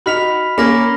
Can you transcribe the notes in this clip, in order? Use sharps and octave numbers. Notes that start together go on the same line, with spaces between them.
D#4 F#4 B5 F6 B6 F7
A#3 C#4 B5 F6 A#6 F7